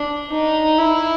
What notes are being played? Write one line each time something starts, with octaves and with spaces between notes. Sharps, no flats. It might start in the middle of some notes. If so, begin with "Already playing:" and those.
Already playing: D4
D#4
E4